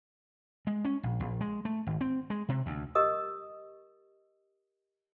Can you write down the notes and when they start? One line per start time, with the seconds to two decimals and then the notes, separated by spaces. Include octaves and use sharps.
0.67 G#3
0.85 C#4
1.03 A#1
1.20 A#1
1.41 G#3
1.65 A3
1.87 G#1
2.01 C4
2.30 G#3
2.49 C3
2.66 D2
2.95 G4 A#4 D#5 D#6